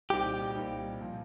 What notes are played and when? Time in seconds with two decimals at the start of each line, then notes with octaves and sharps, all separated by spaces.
0.10 C2 A#2 G3 C4 D#4 G4
0.55 C2 A#2 G3 C4 D#4
1.00 A#2 F3 C4